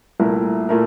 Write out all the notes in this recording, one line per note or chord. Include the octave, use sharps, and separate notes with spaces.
C2 A#2 A3 E4 A#4
A#2 A3 E4 A#4